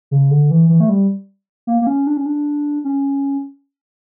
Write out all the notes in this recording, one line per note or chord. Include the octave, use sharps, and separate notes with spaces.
C#3
D3
E3
E3
A3
G3
A#3
A#3
C#4
D4
C#4
D4
C#4